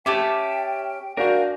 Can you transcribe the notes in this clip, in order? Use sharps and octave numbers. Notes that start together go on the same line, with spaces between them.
C#4 G4 E5 G5 A5 D6
D4 F#4 A#4 F5 G#5 G6